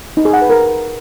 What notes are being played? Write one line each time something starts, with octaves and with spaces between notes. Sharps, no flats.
D#4
G#4
F#5
B4
A#4